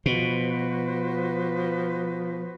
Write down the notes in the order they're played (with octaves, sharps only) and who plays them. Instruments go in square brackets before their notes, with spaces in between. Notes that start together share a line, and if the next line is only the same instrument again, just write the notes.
[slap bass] B2 [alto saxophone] F3 [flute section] F#4 B4 C5